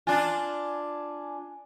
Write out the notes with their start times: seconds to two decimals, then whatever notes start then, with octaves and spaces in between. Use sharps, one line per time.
0.07 D4 F4 G#5